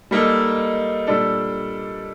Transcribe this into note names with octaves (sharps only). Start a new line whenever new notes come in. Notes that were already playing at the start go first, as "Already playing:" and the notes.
G3 A#3 D#4 A4
A#2 G3 D4 A4